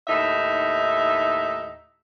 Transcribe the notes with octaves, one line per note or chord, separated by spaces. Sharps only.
D#2 A2 D#4 E5